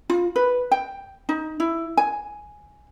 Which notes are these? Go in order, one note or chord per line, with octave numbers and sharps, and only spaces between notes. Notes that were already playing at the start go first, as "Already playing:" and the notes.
F4
B4
G5
D#4
E4
G#5